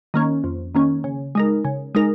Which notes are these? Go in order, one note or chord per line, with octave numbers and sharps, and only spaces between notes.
D#3 A#3 C#4
F2
D#3 A#3 C#4
C#3
G#3 D#4 A#4
C#3
G#3 D#4 A#4